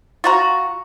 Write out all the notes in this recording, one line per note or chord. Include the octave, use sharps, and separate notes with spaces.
F4 F#4 A#5